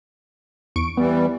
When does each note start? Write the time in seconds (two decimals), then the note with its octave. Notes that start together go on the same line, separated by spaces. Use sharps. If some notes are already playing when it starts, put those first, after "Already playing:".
0.76 E2 C#6 D7
0.97 E3 G3 B3